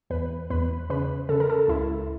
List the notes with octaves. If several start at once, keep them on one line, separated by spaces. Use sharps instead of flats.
E2 B4
E2 B4
C#3 B4
C#3 A4
A#4
A4
C#2 E4